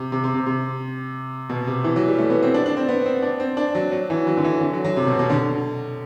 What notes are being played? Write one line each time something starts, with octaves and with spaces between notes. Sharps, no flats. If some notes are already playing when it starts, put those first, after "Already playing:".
Already playing: C3
C3
C3
C3
C3
B2
C3
E3
F#3
G3
A3
B3
C4
D4
D4
C4
B3
C4
D4
C4
D4
F#3
F#3
E3
F#3
D3
E3
D3
F#3
F#3
C3
B2
B2
D3